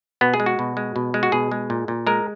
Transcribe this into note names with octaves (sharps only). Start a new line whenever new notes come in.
B2 B3
G#4
G#3
F#4
B2
G#3
B2
G#3
F#4
B2 G#4
G#3
A#2
A#2
G#3 A#4